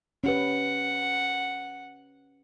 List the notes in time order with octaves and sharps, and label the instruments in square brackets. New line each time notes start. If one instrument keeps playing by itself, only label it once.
[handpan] C#4 G4 B4 [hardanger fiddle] F#5